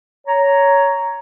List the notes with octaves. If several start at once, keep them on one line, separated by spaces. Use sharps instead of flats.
C#5 A#5